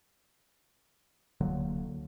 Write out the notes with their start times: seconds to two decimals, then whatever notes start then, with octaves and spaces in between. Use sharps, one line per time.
1.41 D1 D3 F#3 A#3